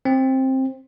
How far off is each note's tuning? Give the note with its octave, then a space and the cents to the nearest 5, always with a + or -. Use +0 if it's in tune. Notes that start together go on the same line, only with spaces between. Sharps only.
C4 +15